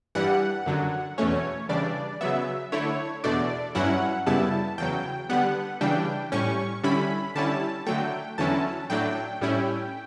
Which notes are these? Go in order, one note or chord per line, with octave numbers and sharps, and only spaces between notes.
G2 E3 G3 F#5
F#2 D3 F#3
E2 B2 A3 C#4 C#5
C#3 E3 G3 D4 D5
C#3 F#3 B3 E5
D3 A3 E4 C#5
E2 B2 A3 D4 D5
G2 F#3 C#4 E4 F#5
F#2 C#3 G3 B3 E4 A5
E2 C#3 F#3 G5
D3 G3 B3 F#5
C#3 E3 G3 D4 G5
A2 G3 C#4 C#6
D3 G3 C#4 E4 B5
D3 G3 C#4 E4 A5
D3 F#3 A3 G5
E2 D3 F#3 C#4 E4 A5
A2 F#3 A3 D4 G5
A2 G3 C#4 E4